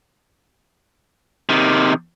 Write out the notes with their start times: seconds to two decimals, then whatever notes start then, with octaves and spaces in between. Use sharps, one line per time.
1.49 C3 D#3